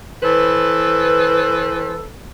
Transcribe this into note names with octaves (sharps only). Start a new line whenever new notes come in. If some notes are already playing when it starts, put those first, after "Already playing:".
E3 A4 B4 C5